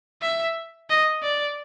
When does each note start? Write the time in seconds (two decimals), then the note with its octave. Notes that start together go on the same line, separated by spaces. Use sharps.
0.22 E5
0.90 D#5
1.23 D5